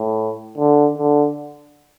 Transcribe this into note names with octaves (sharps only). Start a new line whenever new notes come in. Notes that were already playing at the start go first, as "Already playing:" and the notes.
Already playing: A2
D3
D3